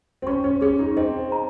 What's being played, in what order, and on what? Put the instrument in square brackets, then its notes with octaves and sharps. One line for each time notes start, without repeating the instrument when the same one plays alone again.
[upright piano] C4
[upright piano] C#4 [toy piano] C#6
[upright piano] C#4
[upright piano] C#4 [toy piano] G#4
[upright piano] D#4
[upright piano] C4 [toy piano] D#5
[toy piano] A#5